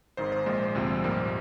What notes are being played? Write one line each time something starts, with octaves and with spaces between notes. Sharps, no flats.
G#1 G#2 D#3 C5
C5
A#1 A#2 G#3 C5
D2 C3 F3 G#3
A#1 G#2 G3 A#3